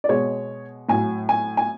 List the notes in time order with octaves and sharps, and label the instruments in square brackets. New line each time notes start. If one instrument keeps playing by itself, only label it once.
[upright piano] D5
B2 G#3 C#5
A2 F#3 G#5
G#5
G#5